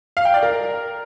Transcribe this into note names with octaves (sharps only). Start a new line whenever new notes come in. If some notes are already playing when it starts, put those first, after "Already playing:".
F5
G5
D5
A#4